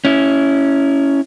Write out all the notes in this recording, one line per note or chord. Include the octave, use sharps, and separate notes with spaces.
C#4 E4